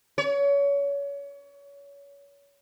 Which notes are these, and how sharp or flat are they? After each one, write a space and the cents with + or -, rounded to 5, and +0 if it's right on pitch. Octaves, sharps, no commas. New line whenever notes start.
C#5 +30